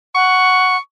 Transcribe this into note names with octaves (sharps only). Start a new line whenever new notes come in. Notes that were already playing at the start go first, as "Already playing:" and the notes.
F#5 C#6